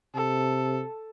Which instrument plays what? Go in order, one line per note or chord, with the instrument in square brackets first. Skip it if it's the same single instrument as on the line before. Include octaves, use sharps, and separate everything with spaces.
[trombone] C3 [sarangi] A4